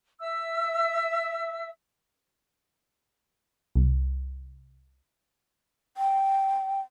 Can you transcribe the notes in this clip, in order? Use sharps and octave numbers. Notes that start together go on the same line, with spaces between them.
E5 E6
C2
G5